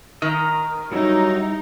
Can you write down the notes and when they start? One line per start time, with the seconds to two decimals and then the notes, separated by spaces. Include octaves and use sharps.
0.22 D#3 D#5 A#5
0.92 F#3 G3 D#4 E4